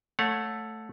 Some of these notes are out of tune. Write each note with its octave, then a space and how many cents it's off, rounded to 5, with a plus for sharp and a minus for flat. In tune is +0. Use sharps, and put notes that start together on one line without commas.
A3 +0 C#5 +0 F#5 -35